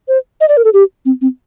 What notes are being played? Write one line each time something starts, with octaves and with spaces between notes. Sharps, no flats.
C5
D#5
D5
A#4
A4
G4
C4
C4